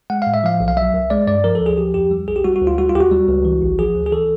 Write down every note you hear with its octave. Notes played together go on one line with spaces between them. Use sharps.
G#3 F#5
A2 F5
E5
F3 F5
B1
F5
F#3 E5
C2
G#3 D5
G2 D5
F3 A#4
A4
D2
G#4
F3 G4
F2 G4
G3
B1 G#4
G4
G3 F#4
F#4
D2
F4
G3 F#4
F4
D#2 G4
F#4
G3
C#2
E3
A1
F3 G#4
D2
G#4
E3 A4